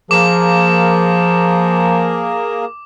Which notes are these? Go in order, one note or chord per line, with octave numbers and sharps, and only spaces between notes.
F3 A#3 G#4 A#4 D6